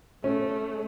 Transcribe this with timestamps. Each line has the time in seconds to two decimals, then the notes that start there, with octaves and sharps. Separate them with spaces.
0.24 A3 C#4